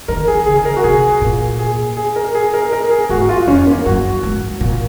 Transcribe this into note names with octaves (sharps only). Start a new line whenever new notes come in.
D#3 A#4
G#4
C#3 G#4
A#4
F#4
C3 G#4
A#2
G#4
G#4
A#4
G#4
A#4
A#4
G#4
G#2 F#4
F#4
F4
F2 C#4
A#3
F#2 F#4
G#2
A#2